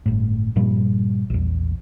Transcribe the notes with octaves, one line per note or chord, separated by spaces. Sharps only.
G1 A2
G2 A#2 F3 G3
A#1 E2